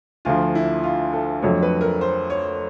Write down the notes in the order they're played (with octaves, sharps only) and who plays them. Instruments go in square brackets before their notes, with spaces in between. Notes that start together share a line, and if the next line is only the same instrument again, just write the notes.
[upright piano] D2 D3 F3 [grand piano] F4
[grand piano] E4
F4
A4
[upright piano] F2 D3 F#3 A3 [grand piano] C#5
[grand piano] B4
A#4
C5
C#5